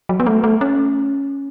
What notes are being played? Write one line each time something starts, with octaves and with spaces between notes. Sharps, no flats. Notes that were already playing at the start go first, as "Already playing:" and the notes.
F#3
B3
A3
A3
C#4